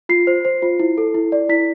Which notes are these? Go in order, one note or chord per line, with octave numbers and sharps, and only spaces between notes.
F4 C7
C5
C5
F4
E4
A4
E4
D5
E4 B6